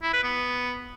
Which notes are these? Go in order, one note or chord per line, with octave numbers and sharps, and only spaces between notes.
E4
B4
B3